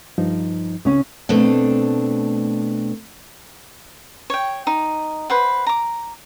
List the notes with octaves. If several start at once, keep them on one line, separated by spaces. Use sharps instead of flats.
G2 F3 D#4
C#2 C#3 C#4
B2 A3 C4 D4
C#5 G5
D#4
B4 C5 F#5
A#5 D6